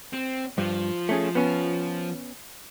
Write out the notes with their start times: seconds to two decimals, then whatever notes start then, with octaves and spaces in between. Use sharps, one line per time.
0.13 C4
0.58 G2 F3 F4
1.09 A3 C#4 G#4
1.35 B3 C#4